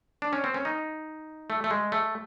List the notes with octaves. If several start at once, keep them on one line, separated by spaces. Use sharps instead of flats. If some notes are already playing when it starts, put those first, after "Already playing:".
D4
C#4
C4
C#4
D#4
A3
A3
G#3
A3